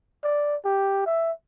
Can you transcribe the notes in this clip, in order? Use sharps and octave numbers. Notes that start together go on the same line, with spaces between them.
D5
G4
E5